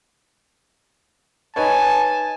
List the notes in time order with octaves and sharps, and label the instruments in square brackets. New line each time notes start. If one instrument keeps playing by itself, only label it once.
[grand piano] D#4 B4 C#5 [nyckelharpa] G#5 [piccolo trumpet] A5